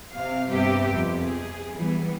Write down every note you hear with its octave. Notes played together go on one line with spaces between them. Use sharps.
C3 F5
G2 C3 B3 G4 E5
F2
G#4
E3 G3 B3